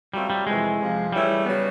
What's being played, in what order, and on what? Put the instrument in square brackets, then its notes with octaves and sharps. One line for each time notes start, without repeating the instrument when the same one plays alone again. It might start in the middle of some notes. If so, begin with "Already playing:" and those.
[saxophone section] F#3 A3 C4 F4 [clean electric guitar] G3
[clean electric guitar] G3
[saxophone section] F2 C3 E3 A3 [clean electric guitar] G#3
[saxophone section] F2 C3 F3
[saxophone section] E3 A3 C#4 E4 G#4 [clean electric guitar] G3
[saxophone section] C#3 F#3 B3